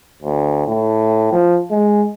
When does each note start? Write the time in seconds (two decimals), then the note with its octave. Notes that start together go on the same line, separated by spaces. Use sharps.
0.23 D2
0.67 A2
1.32 F3
1.71 G#3